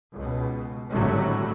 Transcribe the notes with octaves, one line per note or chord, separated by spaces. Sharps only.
C#2 B2
G#1 A2 D3 F#3 G3 A3